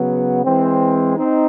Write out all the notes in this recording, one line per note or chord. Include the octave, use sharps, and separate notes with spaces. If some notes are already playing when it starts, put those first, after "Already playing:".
Already playing: C#3 F#3 B3
E3 G#3 C4
C4 D#4